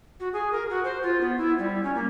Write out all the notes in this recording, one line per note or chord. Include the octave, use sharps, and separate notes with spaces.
F#4
G#4
A#4
F#4
C5
F4
B3
E4
G3
C#4
A#3